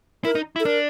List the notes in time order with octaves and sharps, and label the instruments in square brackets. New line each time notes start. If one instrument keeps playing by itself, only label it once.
[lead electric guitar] E4 [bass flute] A#4
[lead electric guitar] D#4
E4
[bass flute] A4
[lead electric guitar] D4 [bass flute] A#4